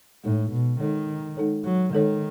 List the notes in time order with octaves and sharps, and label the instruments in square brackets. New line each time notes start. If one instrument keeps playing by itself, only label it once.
[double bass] A2 [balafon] G#3 D#4 A4 C#5
[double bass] B2
[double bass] D#3 [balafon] G#3 D#4 A4 C#5
[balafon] G#3 D#4 A4 C#5
[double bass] F#3
[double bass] D#3 [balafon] G#3 D#4 A4 C#5